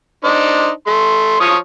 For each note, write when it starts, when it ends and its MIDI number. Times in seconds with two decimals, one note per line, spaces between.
0.24 0.70 62
0.24 0.70 63
0.24 0.70 72
0.87 1.38 57
0.87 1.38 84
1.40 1.56 53
1.40 1.56 73
1.40 1.56 87